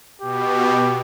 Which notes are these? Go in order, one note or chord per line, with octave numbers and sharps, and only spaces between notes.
B2 G4